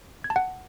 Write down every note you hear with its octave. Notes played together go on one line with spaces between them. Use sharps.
G#6
A5
F#5